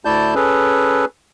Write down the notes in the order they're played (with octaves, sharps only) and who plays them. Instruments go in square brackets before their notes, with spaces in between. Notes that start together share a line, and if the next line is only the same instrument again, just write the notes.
[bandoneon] D2 A3 E4 D5 A5 G6
C#4 G#4 A4 B4